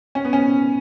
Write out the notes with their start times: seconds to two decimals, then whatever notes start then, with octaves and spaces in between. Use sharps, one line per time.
0.15 C#4
0.25 B3
0.33 C#4